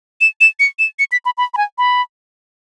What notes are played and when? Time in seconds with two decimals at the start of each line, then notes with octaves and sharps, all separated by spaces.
0.21 E7
0.41 E7
0.60 C#7
0.79 E7
0.99 C#7
1.12 B6
1.25 B5
1.38 B5
1.54 B5
1.57 G#5
1.78 B5